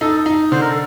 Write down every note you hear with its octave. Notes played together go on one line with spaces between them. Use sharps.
D#4 A4
D#4
D3 C5
A#4
A4